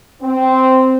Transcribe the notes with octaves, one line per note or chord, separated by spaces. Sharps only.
C4